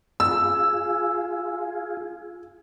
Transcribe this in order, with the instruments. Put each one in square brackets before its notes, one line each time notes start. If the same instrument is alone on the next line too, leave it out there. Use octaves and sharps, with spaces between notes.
[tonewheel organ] F4 G#4 [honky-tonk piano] E6